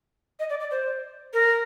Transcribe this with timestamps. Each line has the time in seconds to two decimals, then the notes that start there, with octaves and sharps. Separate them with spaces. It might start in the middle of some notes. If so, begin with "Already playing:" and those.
0.39 D#5
0.50 D5
0.60 D5
0.71 C5
1.33 A#4